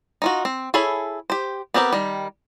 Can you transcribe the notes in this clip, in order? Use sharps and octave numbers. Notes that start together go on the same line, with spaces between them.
D#4 F4 F#4
C4
E4 G#4 A4 C#5 B5
G4 C5
B3 C4 G4 A#4 B4
D#3 G3